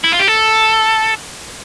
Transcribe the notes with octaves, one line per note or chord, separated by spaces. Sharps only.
E4
F4
G4
A4